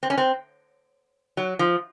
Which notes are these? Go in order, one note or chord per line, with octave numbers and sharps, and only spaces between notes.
C4
C#4
C4
F#3
F3